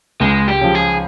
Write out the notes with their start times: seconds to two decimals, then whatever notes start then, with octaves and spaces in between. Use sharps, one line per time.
0.20 C#2 G#3
0.48 G4
0.61 C#3 F3
0.75 G#4